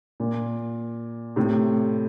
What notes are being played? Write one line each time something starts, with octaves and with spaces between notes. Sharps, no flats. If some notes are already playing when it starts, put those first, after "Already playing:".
A#2
A2 C3